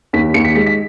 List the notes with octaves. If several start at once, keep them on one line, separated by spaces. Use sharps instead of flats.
D#2 B6
D#2 C#7
B6
G#3 B6
B6